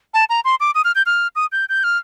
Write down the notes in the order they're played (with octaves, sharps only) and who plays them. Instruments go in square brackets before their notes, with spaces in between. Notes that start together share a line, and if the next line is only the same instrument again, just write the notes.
[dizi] A5
A#5
C6
D6
D#6
F6
G6
F6
D#6
G6
G6
F6